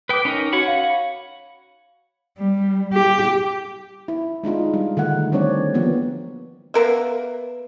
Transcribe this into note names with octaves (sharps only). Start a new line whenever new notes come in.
B4 G5 D6 D#6
C#4 D#4 A#4 B6
F#4 C#5 F#5 B5
F5
G3
G4
E4
G#3 D4 D#4 F4
G3
D3 D#3 A3 F#5
E3 G3 C4 D4 C#5 D5
F3 A#3 B3
A#3 B3 A#4 E5